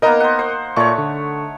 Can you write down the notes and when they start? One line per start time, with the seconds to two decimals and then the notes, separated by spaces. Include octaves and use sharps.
0.02 A#3 B3 D#4 A#4 D#5 A#5
0.20 C5 F#5
0.39 C5
0.76 A#2 A3 C#5 D5 C#6
0.98 D3